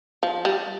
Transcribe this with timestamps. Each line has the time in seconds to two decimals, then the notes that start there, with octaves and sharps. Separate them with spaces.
0.23 F3
0.45 G3